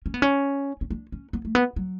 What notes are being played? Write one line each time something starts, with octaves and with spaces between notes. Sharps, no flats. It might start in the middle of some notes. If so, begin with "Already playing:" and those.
C#4
B3
C#4
C#4
D4
C#4
B3
A3
B3
F#3